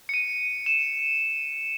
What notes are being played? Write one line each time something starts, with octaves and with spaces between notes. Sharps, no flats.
C#7
D#7
E7